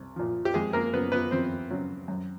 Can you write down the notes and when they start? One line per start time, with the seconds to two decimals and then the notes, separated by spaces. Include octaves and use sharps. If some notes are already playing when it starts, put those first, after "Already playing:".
Already playing: C2
0.16 A#2 F3
0.45 G4
0.54 F2 G#3 G#4
0.73 A#3 A#4
0.93 C#3 F#3 B3 B4
1.12 B3 B4
1.31 F2 C4 C5
1.71 C#3 F#3
2.08 F#2